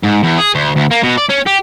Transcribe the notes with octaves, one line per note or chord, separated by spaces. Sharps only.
G#2
E2
G#4
D2
D2
A#3
B2
D5
C#4
G4